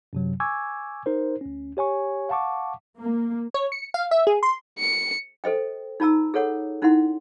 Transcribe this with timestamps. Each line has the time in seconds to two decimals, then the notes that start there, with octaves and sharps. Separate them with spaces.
0.13 F#2 C3 F#3
0.40 G#5 C#6 D6 E6 G#6
1.06 D#4 A#4 C5
1.41 D2 C#4
1.77 G4 C#5 G#5 C#6
2.29 F5 F#5 A5 C#6 D6
2.98 A#3
3.54 C#5
3.72 C#7
3.94 F5
4.11 E5
4.27 G#4
4.43 C6
4.79 C#7
5.44 A4 C5 D#5 G5
6.00 D#4 F4 A5 A#5 E6
6.34 G#4 A4 C#5 F#5
6.82 C#4 D#4 E4 F#5 C6